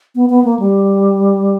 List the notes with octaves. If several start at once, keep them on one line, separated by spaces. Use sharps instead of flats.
B3
B3
A#3
G3